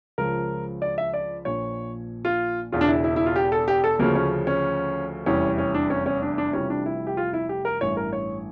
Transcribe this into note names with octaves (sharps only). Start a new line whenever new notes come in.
C#2 C#3 F3 A#4
D5
E5
D5
A#1 A#2 F3 C#5
F4
E1 E2 C#3 F4
D4
E4
E4
E4
F4
G4
A4
G4
A4
D2 C#3 F3 A#3
C#4
C#4
F1 E2 E3 G3 C#4
C#4
D4
C#4
C#4
D4
D4
F1 F2 E3 G3 C#4
D4
E4
G4
F4
E4
G4
A#4
A1 G2 E3 C#5
A#4
C#5